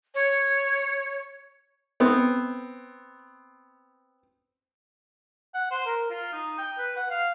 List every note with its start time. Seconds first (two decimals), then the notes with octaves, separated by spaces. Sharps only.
0.15 C#5
2.00 B3 C4
5.54 F#5
5.71 C5
5.86 A#4
6.11 F4
6.33 D#4
6.58 G5
6.78 B4
6.96 F#5
7.10 F5